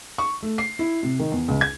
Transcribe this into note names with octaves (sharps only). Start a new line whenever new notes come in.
C#6
A3
C7
E4
C3
D#3
E2
C#2
G#6